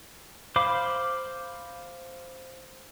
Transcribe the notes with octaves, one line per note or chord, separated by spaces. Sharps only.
C5 F5 B5 D6